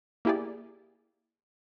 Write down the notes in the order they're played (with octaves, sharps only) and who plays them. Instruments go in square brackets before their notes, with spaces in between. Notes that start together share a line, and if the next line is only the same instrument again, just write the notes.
[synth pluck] A#3 E4 G4 G#4 D5